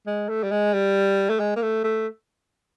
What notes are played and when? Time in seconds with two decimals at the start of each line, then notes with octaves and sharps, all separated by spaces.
0.07 G#3
0.29 A3
0.43 G3
0.51 G#3
0.73 G3
1.30 A3
1.40 G#3
1.56 A#3
1.62 A3
1.84 A3